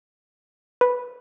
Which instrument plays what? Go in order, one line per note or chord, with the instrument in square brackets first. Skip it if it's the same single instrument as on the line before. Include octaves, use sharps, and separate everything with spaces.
[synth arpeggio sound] B4